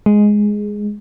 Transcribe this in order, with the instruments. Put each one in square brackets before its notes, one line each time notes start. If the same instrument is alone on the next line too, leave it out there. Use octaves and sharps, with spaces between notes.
[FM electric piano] G#3